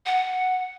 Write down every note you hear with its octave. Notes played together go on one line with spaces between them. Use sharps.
F#5